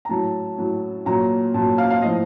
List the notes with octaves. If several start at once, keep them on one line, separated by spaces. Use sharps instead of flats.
A#5
A2 F#3 A5
A2 F#3
A#2 F#3 A#5
A#2 F#3 A5
F5
F5
A2 F3 D#5